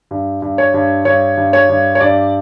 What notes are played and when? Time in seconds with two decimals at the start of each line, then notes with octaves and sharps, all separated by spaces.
0.11 G2
0.42 G2
0.58 C#5
0.74 G2
1.05 G2 C#5
1.37 G2
1.53 C#5
1.69 G2
1.95 C#5
2.00 G2 D5